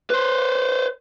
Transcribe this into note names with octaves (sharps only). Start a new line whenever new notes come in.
B4 C5